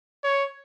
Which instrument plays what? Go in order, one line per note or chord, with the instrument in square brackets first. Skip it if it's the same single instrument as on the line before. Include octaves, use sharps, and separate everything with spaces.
[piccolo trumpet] C#5